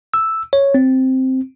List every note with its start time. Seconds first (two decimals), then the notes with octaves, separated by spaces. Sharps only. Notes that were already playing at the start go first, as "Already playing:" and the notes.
0.14 E6
0.53 C#5
0.74 C4